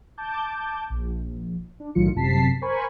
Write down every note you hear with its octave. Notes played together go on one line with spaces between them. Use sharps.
A5 D6 G6
A#1
D4
B1 A2 D#3 F#3 F4 C#7
G1 F#2 C3 A5 B6 C7
A#4 C5 G#5 B5 C#6